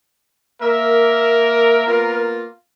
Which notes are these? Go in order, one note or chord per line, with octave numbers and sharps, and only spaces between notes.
A#3 A#4 E5
A#3 B3 F4